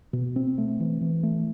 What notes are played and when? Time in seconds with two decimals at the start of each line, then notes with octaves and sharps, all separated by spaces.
0.13 B2
0.36 C4
0.58 A3
0.80 E3
1.01 E3
1.23 A3